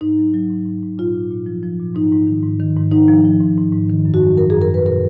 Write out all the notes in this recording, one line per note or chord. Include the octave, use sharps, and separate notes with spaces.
G#2 D#4
F#3
F#3
G#2
G#2
G#2
A#2 F4
A#2
A#2
F3
F3
A#2
G#2 D#4
G#2
D#3
G#2
D#3
G#2
G#2 D#4
F3
F3
G#2
G#2
G#2
D#3
F#2
F#4
F#3
F#2 A#4
F#2 G#4
A#4
F#2 B4
A#2 A#4